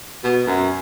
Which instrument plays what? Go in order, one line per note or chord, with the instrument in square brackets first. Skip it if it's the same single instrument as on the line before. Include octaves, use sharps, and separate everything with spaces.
[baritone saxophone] B2
F#2